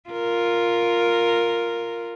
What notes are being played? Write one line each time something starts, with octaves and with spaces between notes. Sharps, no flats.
F4 A#4